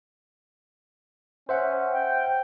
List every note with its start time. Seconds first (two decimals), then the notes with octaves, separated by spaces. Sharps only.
1.49 C#4 C5 E5 F#5
1.92 G5